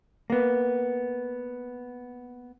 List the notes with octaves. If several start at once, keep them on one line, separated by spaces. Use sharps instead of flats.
A#3 B3